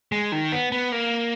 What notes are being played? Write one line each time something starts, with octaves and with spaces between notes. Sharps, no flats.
G#3
D#3
B3
B3
A#3